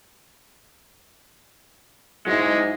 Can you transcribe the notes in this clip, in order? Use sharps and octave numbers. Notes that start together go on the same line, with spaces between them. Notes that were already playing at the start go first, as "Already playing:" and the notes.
G#2 F#3 G#3 E4